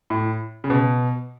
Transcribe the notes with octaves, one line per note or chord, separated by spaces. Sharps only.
A2
C#3
B2